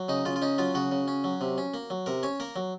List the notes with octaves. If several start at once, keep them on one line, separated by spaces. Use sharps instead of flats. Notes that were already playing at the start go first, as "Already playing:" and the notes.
Already playing: F#3
C#3 D#4
C#3 F4
F4
C#4 D#4
F#3 F4
C#3 F#4
C#3
C#4
F#3
C3
C#4
A#3
F#3
C3 A#4
C#4 C#5
A#3 A#4
F#3